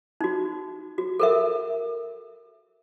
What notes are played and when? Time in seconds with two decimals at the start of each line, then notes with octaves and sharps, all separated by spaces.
0.21 D#4 F#4
0.98 F#4
1.20 A4 A#4 E5